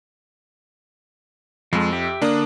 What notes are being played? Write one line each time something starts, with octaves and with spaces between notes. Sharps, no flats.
F2 F3 G#3
G4 E5
D3 A#3 D4 D#6